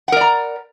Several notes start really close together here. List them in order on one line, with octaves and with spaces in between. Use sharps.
F#5 A#4 D5 A#5